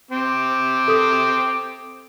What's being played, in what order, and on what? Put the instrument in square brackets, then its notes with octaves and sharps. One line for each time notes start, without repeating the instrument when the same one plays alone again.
[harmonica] C4 D6
[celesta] A4 D#6